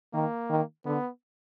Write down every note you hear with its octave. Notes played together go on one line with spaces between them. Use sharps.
D#3 A#3
D#3
D3 B3